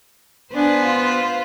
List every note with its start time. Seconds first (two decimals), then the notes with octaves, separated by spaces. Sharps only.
0.54 B3 D4 B4 C5 G#5
0.84 F4